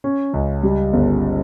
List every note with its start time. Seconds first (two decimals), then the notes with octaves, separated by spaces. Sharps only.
0.04 C#4
0.33 C#2
0.63 G3
0.93 G1